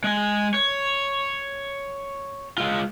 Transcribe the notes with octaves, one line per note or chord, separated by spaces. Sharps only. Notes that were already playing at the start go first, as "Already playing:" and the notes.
G#3 G#5
C#5
G#3 F4